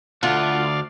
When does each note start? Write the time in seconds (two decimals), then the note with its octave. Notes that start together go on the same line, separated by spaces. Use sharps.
0.23 D2 A3 F4 D5 F5 F#5